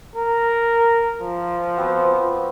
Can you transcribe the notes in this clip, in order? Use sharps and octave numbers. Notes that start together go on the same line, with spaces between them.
A#4
F3
B3 C4 F#4